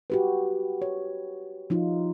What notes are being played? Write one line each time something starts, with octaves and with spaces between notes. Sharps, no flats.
F#4 G4 B4
C#5
F3 D#4 F4